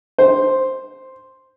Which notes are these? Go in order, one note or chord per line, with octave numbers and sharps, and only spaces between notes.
C5